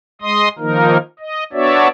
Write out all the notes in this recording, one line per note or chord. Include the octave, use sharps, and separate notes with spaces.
G#3 D#5 C6 D#6
D#3 F3 A#3 D#4 A#4
D#5
B3 D4 F#4 C#5 D5 E5